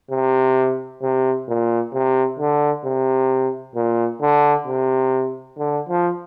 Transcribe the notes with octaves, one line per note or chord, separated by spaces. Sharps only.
C3
C3
A#2
C3
D3
C3
A#2
D3
C3
D3
F3